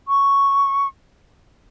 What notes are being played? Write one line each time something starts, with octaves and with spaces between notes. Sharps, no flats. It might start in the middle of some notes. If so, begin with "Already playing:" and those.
C#6